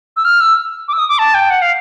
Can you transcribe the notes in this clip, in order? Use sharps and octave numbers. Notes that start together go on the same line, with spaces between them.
E6
F6
E6
D6
E6
D#6
D6
A5
G5
F#5
F5